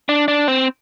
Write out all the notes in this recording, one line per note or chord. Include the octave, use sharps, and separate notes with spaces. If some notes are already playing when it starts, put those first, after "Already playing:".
D4
D4
C4